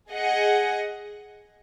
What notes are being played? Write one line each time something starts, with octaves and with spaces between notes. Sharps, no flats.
G#4 D#5 F#5